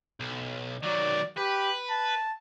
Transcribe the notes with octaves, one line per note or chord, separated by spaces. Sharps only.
B1
D#3 F#3 D5
G4 B4
A5